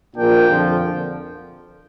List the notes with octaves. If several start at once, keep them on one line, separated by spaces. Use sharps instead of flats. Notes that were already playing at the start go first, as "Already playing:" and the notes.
A#1 A#2 A#3 D4 G5
F2 D3 F3